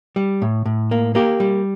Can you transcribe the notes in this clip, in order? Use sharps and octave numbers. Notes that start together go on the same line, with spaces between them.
G3
A2
A2
A#3
A#3 G4
G3